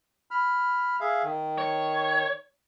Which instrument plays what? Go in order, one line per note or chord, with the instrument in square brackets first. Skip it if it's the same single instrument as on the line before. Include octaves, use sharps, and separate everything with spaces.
[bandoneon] B5 F6
G#4 E5 F5
D#3
[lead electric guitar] C#5